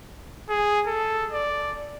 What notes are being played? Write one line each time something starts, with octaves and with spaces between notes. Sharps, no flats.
G#4
A4
D5